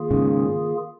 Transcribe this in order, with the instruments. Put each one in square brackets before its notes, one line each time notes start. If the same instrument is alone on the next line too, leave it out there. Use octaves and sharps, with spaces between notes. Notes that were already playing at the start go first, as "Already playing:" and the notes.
Already playing: [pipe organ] D#3 A#3 F4 G#4
[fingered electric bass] G#2 C#3